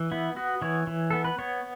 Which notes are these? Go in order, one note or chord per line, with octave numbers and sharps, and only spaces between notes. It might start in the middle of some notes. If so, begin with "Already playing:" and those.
Already playing: E3
B3 E4
B3 F#4
E3 C#5
E3
B3 A4
B4
B3 C#5